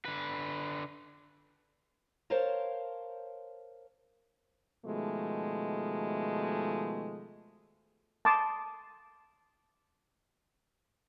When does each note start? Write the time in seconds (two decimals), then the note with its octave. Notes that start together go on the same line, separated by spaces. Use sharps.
0.05 D3 B4
2.30 A#4 C5 C#5 F5 A5 A#5
4.85 B2 D#3 F3 G#3 A3
8.25 A5 C6 D6 D#6